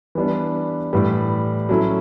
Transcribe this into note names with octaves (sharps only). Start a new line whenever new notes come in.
E3 G3 B3 D4
A2 E3 G3
F#3 C#4 E4 A4